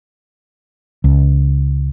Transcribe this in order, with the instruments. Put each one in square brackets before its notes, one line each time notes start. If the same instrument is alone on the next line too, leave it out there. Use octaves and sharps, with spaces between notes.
[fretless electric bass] C#2